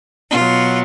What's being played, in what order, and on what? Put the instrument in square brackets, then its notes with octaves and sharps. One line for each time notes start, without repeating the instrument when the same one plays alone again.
[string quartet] B2 F#3 F4